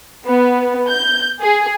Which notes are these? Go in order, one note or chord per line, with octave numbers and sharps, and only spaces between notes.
B3
G6
G#4